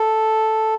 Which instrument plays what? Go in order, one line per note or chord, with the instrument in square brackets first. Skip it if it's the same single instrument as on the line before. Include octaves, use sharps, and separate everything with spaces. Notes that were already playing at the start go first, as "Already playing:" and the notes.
Already playing: [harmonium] A4